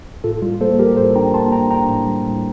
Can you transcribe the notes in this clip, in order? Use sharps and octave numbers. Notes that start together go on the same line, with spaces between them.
A2 F4 A4
G3 F4
A#3 A4 C5
G3 G4 A#4
A2 A4 C5
D4 G5 A#5
A#3 A5 C6
D4 G5 A#5
D4 G5 A#5
A2
G3
A2